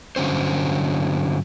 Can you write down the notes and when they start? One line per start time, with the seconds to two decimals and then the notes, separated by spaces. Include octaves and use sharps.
0.16 G2 D3 F#3 C#4 C5